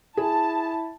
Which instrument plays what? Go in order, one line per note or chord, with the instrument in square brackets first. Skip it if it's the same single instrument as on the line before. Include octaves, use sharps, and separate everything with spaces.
[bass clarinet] E4 [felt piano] G#4 [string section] A5